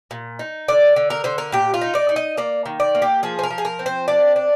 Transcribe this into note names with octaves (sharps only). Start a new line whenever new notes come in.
A#2
D#4
D3 D5
D3
A#4
D3 C5
A#4
A#2 G4
F4
D#4
D5
D#4
D#5
A#3 D5
D#3
D5
A#3
G4
F3 G#4
C5
A#4
F3
G#4
A#4
C4
C5
D4 D5
D4